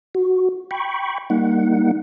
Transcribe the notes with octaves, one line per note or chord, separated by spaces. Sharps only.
F#4
G5 B5 C#6
G3 A#3 D#4 F#5